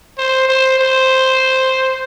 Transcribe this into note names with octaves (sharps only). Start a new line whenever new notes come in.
C5
C5
C5